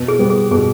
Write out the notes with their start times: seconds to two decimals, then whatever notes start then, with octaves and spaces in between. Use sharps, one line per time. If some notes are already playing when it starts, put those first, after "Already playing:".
Already playing: B2
0.08 G#4
0.19 G3 B3
0.30 G#4
0.51 B2 G#4